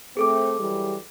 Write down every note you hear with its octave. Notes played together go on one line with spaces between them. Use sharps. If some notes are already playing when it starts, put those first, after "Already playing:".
A3 C4 G#4 A4 D6
E3 F#3 G3